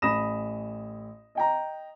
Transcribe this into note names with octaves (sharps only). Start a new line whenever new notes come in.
A1 B5 D#6 A#6 E7
D#5 G5 A#5